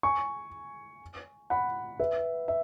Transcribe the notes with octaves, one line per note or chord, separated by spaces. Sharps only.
G#5 C#6
F#5 B5
B4 E5
E5